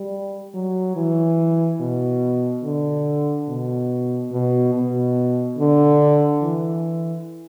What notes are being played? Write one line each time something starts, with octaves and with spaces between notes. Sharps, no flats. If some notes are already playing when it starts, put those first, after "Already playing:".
Already playing: G3
F#3
E3
B2
D3
B2
B2
B2
D3
E3